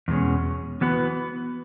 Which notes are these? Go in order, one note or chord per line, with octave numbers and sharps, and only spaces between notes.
E2 B2 G#3 C#4
E3 B3 F#4 B4